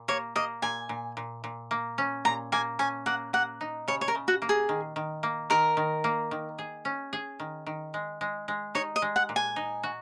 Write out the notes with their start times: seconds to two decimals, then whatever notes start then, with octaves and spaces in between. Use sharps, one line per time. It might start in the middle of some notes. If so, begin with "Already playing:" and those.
Already playing: A#2
0.08 A#3 C#5
0.36 A#3 D#5
0.62 A#2 G#5
0.89 A#2
1.17 A#2
1.44 A#2
1.71 A#3
1.98 C#4
2.25 A#2 A#5
2.52 A#3 G#5
2.79 C#4 G#5
3.06 A#3 F#5
3.33 A#3 F#5
3.61 D#4
3.88 C#3 C#5
4.01 C#5
4.08 A#4
4.15 C#3
4.28 F#4
4.42 A#3
4.49 G#4
4.69 D#3
4.96 D#3
5.23 A#3
5.50 D#3 A#4
5.77 D#3
6.04 A#3
6.31 D#3
6.59 G#4
6.85 C#4
7.13 G#4
7.40 D#3
7.67 D#3
7.94 G#3
8.21 G#3
8.48 G#3
8.75 D#4 C#5
8.96 D#5
9.02 G#3
9.16 F#5
9.29 A#2
9.36 G#5
9.56 D#4
9.83 F#4